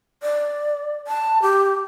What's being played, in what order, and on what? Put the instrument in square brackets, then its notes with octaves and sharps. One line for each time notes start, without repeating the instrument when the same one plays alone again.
[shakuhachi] D5
A5
G4